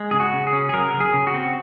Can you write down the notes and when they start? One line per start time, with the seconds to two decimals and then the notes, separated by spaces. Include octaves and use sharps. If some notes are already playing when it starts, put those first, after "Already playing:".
Already playing: G#3
0.11 C#3 G#4
0.20 F#4
0.33 C#3
0.47 G#4
0.53 C#4
0.69 G#4
0.74 F#3 A#4
0.94 C#3
1.00 G#4
1.14 C#3
1.27 F#4
1.34 C4